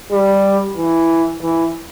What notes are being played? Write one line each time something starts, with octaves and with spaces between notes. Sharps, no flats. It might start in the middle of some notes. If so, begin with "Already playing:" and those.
G3
E3
E3